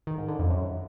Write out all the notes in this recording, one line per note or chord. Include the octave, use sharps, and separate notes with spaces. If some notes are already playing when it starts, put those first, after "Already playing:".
D#3
G#2
D3
F2
F#2